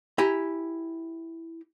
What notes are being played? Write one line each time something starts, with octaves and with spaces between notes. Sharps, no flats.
E4 G4 G#5 A#5